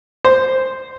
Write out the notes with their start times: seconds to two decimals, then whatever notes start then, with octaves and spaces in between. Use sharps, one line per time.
0.25 C5